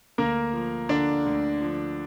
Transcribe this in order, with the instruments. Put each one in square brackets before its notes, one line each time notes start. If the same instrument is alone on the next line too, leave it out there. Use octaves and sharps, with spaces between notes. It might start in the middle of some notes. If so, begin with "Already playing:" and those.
[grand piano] D2 A#3 A#4
F3
D3 D4 D5
D2
F3